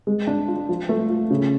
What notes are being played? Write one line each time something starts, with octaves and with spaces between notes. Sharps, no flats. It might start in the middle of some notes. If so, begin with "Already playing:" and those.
G#3
D4
F4
F3
A3
F4
C#3